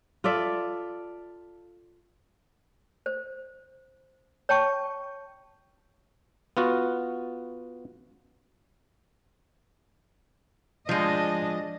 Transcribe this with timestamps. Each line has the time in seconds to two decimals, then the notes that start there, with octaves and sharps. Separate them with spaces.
0.24 F4 A4 D5 E5
3.06 C5
4.49 C#5 G5 A5 C#6
6.57 B3 F4 F#4
10.89 F3 G#3 D4 D#5